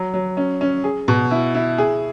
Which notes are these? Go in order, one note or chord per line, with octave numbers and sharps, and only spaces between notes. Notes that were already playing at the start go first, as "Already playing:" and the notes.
Already playing: F#3
F#3
C#4
C#4
G#4
B2
E4
E4
G#4